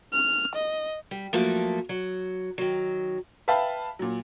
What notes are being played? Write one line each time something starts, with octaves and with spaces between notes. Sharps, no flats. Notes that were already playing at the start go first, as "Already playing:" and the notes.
F6
D#5
G3
F3 F#3 A3 A#3
F#3
D#3 F#3
B4 E5 F5 G5 A5 B5
A#2 F#3